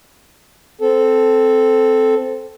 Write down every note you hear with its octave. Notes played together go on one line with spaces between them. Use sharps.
C4 A4